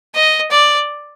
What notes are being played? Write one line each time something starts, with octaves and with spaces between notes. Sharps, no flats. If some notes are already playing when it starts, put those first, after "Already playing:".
D#5
D5